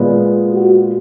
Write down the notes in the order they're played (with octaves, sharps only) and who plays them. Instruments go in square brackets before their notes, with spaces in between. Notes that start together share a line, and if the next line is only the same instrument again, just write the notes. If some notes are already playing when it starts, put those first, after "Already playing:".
Already playing: [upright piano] A#2 G#3 B3
[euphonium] F#4